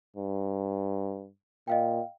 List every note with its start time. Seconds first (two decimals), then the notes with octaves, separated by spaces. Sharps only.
0.16 G2
1.68 A#2 D#5 F5 G5